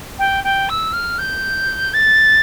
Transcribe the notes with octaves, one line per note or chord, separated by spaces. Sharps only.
G5
G5
E6
F6
G6
A6